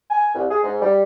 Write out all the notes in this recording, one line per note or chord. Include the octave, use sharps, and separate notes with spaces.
G#5
C2
G#4
G#2
G3